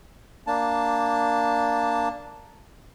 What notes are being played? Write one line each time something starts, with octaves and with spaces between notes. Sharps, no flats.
A#3 D4 A5